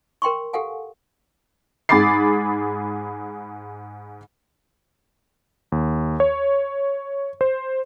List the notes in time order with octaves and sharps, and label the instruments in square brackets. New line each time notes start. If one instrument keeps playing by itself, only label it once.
[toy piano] A#4 G5 C6 C#6
G4 A4 F5 F#5 G#5
[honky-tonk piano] G#2 G#4 B5 D6 A6 C7
[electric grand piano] D#2
C#5
C5